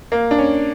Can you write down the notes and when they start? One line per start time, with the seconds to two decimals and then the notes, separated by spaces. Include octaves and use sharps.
0.12 A#3
0.31 D4
0.38 C#4